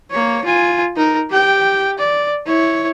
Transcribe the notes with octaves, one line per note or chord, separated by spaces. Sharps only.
A#3 C#5
F4 G#5
D#4 A#4
G4 G5
D5
E4 C#5